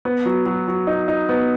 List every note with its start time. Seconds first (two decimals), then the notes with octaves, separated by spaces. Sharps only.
0.05 B3
0.25 F#3
0.46 F#3
0.68 F#3
0.87 D#4
1.08 D#4
1.29 B3